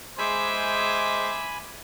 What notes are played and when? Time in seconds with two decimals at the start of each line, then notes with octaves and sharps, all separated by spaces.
0.18 G#3 C5 E5 G#5 B5 D6